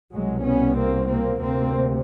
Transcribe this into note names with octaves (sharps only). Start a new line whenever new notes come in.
C2 B2 F#3 G#3
B3 C#4
A#3 C4
A#3 C4
D2 C3 A#3 C4